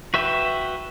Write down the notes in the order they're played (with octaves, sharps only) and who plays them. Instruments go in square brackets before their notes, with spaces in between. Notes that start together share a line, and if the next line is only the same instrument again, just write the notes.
[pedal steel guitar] F#4 B4 E5 G5